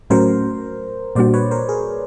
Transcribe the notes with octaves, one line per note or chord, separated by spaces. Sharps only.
A2 F#3 A3 C#4 F#4 A#4 C5
A#2 G3 A#3 D4 F#4 C5 D5
B4 C#5
A#4 C5
G#4 A#4